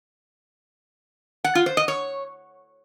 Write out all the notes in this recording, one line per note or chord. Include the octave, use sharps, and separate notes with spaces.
F#5
F4
C5
D#5
C#5